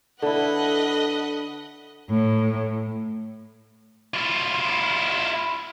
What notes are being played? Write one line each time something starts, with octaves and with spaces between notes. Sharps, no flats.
D3 E4 A4 B4 D#5 F#5
A2
E4 F4